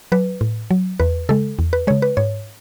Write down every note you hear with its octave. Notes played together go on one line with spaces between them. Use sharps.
F#3 B4
A2
F#3
E2 B4
C#3 G#3 A4
E2
B4
C#3 G#3 C#5
B4
G#2 C#5